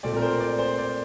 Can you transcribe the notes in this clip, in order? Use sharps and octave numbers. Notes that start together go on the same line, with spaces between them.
A#2 A3 C4 D5
A#4
C5
D5
C5
D5